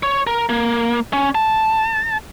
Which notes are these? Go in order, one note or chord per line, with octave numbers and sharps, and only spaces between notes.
C#5
A#4
A#3
C#4
A5